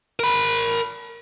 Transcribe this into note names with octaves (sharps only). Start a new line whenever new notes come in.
A#4 B5